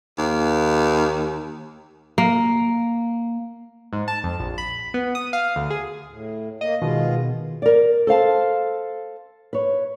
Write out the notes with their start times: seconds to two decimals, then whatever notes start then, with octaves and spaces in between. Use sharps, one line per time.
0.18 D#2
2.18 A#3
3.93 G#2
4.08 A5
4.23 F2
4.40 A#1
4.58 B5
4.94 B3
5.15 D#6
5.33 F5
5.56 D2
5.70 G#4
6.09 A2
6.61 A#3 D#5
6.82 B2 D#3 G#3 F4
7.62 A#4 D5
8.07 A4 C5 F5 A5
9.53 B4 C#5